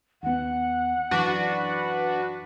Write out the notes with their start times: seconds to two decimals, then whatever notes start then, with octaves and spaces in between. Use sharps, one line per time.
0.23 D#2 B3 F#5
1.11 F#2 E3 F#3 D4 F#4 B4